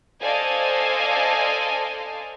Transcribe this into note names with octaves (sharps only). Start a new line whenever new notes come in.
A4 C5 D5 D#5 F5 G#5